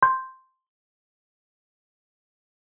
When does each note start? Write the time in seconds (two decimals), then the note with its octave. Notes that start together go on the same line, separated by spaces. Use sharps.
0.03 C6 G6